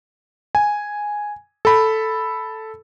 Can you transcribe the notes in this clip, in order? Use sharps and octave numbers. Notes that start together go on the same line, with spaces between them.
G#5
A4 B5